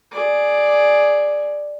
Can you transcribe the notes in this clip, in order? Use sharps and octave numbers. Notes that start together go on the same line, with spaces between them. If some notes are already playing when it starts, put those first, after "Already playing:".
G#4 D5